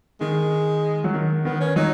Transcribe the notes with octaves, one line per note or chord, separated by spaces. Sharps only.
D#3 G#3
F#3
D#3
D#3 B3
C#4
F#3 D#4